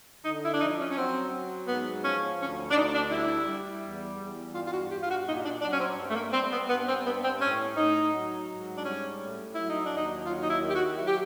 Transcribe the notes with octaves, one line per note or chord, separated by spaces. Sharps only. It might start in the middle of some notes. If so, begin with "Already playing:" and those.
D3 D#4
E4
D4
F3 D#4
C#4
C#4
F#3 C4
F#3
G#2 B3
F3 C#4
D2 C#4
D4
D2 D#4
D4
G3 E4
G3
E2
E2
G2 F4
F4
F#4
G2 G4
F4
F#4
A#2 D#4
D4
F#3 D4
C#4
C4
G2
A3
A#3
G3 C4
B3
G2 B3
C4
G2 B3
C4
A2 C#4
A2 D#4
F#3
G#2
D4
G3 C#4
A2
F#3 E4
D#4
D4
D#2
D#4
F#3 F4
D#4
E4
D#3
G4
F#4
F#3 E4
G4